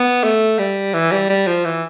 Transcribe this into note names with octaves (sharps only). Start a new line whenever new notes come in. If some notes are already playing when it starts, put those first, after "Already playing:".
Already playing: B3
A3
G3
E3
G3
G3
F3
E3